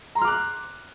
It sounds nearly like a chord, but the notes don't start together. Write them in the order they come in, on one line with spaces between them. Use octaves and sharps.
A#5 C6 F6 D6 F#6